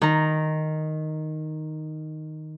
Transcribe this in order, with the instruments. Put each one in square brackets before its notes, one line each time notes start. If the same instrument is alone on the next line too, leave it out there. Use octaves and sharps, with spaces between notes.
[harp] D#3 A#5